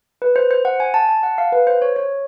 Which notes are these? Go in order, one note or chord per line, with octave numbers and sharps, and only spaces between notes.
B4
C5
C5
F#5
G#5
A5
A5
F#5
F5
B4
C5
C#5
C#5